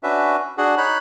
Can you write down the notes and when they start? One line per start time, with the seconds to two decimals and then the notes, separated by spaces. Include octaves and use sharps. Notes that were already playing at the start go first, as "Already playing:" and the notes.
0.03 C#4 D4 F#4 B4 E5
0.58 D4 F#4 G#4 F#5
0.78 D#4 C#5 B5 F#6